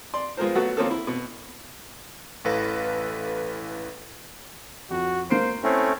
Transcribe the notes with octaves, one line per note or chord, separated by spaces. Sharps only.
D5 C6
F3 G#3 B3 F4 A#4 C5
F#3 A3 B3 F#4 A4
F3 A#3 C4 C#4 G#4 A4
E4
B2
A1 E3 A4 B4 F5 A#6
F2 F#4
A#3 C5 C7 D7
A3 C4 C#4 E4 C5